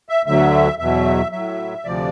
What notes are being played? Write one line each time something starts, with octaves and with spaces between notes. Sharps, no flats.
E5
D2 D3 F#3 E5
E2 B2 F#3 E5
A2 F#3 E5
D2 C3 F3 D5